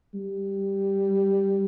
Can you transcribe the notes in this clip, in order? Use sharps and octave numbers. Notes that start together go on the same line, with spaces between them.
G3